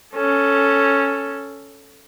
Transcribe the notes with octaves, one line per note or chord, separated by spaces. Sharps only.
C#4 A4